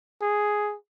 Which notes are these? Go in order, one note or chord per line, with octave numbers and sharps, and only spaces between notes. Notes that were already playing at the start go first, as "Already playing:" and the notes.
G#4